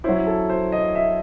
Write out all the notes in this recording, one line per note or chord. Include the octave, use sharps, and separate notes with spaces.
F#3 C#4 E4 C5
A4
C5
D#5
E5